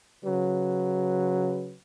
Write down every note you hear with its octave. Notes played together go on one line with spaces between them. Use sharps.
C#3 F#3 B4